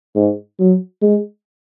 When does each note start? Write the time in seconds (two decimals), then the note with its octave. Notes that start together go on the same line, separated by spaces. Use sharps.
0.16 G#2
0.59 F#3
1.02 G#3